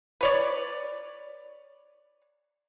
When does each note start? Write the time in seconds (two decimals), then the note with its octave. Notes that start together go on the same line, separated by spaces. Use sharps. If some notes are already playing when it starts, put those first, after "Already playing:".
0.21 B4 C#5 D5